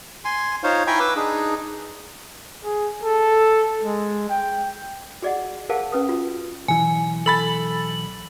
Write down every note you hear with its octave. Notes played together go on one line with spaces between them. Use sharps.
G#5 C6
D#4 F4 C5 C#5 F5
E4 G5 G#5 A#5 B5 C#6
B4 D6 E6
D4 D#4 G#4
G#4
A4
G#3
G5
F#4 G#4 D5 D#5 F#5
G#4 A#4 C5 F5 F#5 A5
C#4 B4 D#6
F4 F#4
B1 E3 G#5
A4 B5 A6 F#7